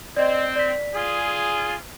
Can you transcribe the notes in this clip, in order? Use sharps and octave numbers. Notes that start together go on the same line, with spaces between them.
C4 D5 D#5
D5 B6
F4 G#4